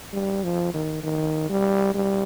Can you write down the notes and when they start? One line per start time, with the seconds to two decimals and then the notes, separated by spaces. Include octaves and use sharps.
0.13 G3
0.44 F3
0.74 D#3
1.04 D#3
1.49 G3
1.94 G3